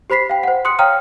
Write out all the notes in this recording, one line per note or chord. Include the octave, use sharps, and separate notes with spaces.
G4 C5 B5 B6 C7
F5 G5
C5 F#5
C6 D#6 F#6 C#7
C#5 F5 G5 A#5 D#6 F6